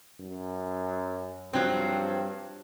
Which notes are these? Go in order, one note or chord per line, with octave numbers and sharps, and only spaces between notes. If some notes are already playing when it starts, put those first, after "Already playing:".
F#2
G2 F3 F#3 C4